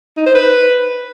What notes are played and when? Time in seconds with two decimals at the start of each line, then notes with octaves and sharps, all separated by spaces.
0.17 D#4
0.26 C5
0.35 B4